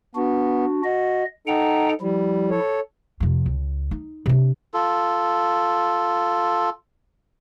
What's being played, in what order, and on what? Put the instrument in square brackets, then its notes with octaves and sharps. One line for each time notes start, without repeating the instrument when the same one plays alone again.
[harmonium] B3 [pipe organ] D4 F#4
[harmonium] F#4 [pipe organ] D#5
[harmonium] D#4 A4 [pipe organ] F#5 G5 A#5
[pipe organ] F3 E4 [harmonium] G3
[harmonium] A4 C#5
[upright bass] F2 C3
C#2
D#4
C3 D4
[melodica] F4 A4